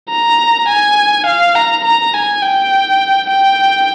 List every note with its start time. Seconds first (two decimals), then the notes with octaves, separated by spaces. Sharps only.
0.10 A#5
0.68 G#5
1.26 F5
1.55 A#5
1.84 A#5
2.14 G#5
2.43 G5
3.30 G5